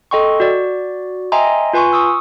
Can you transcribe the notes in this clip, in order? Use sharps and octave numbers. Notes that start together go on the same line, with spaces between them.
A4 D#5 G5 C6 C#6
F#4 D5
D#5 E5 G5 G#5 A#5 C6
F4 B4 G#5 C6 C#6
C#6 D#6 E6